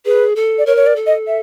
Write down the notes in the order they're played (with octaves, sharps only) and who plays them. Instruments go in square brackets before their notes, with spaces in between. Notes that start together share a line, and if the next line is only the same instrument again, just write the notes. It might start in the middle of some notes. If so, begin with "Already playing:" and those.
[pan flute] G#4 [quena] B4
[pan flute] A4
[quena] D5
[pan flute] A#4 [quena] C#5
[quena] C#5
D5
[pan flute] A4
[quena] D#5
E5